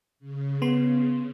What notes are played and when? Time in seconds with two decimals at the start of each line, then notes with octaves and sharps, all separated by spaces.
0.19 C#3
0.62 B3 C6